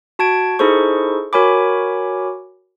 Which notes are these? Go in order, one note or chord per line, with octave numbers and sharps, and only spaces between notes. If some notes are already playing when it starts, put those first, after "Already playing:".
F#4 A5 G#6 D7
D#4 E4 G#4 A4 C5 C#6
F#4 A#4 C#5 G#5 B5 D6